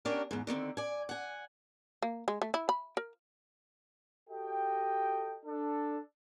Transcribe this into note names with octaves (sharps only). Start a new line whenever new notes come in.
C#4 D4 F#4 G4 A#4
E2 G#2
D3 D#3 A#3 C4
D5 G#5
F#5 G#5
A#3
G#3
A3
E4
B5
A#4
F#4 G4 A4 D#5 G5
D4 A4